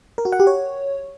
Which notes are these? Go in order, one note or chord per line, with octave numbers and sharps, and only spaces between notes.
A#4
F#4
F#5
G4
C#5